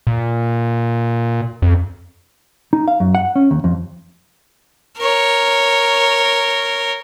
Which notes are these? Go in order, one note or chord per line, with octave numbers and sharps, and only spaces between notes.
A#2
F2
D#4
F5
F#2
F#5
C#4
D#2
F2
A#4 C#5